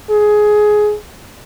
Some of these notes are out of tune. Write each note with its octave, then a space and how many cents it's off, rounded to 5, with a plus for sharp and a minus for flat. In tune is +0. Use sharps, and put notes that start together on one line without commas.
G#4 +15